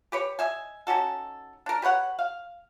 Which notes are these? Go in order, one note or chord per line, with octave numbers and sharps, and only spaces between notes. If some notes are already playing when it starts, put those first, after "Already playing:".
G4 B4 C#5
D#5 E5 G#5
C#4 D#4 F#4 A4
D4 A#4
G4 B4 C#5 F#5
F5